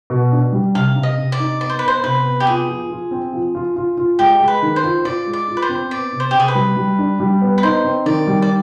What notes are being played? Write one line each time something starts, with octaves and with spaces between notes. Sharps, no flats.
B2
D4
G3
C3 F5
C3
D#5
C3
D5
D#4
B3 D5
C5
B4
B3 C5
C3 B4
B3
G4
F4 G#4
F3
F4
C4
F3
F4
F4
F4
G#3 G4
G#3
B4
D#3
C5
F4
F4 D5
G#3
D5
F4
B4
C5
C4
B3 D5
C3
C5
C3 G4
G#4
B4
G3
G3
D4
G3
B3
B4
D#4 C5
C4
D#3 D5
G3
D5